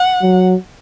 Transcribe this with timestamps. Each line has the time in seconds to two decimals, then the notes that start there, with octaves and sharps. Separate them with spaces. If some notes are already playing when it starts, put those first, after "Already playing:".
Already playing: F#5
0.22 F#3